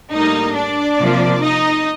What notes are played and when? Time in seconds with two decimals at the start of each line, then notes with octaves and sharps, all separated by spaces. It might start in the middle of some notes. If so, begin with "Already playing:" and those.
0.13 A2 G3 A#3 D#4 D#5
0.55 D4 D5
0.98 C3 F3 A#3
1.42 D#4 D#5